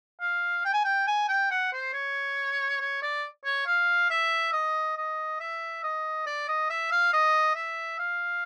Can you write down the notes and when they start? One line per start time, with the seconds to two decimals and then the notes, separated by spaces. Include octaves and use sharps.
0.20 F5
0.65 G5
0.73 G#5
0.84 G5
1.07 G#5
1.28 G5
1.51 F#5
1.73 C5
1.94 C#5
2.80 C#5
3.02 D5
3.45 C#5
3.67 F5
4.10 E5
4.53 D#5
4.97 D#5
5.40 E5
5.83 D#5
6.26 D5
6.48 D#5
6.70 E5
6.91 F5
7.13 D#5
7.55 E5
7.99 F5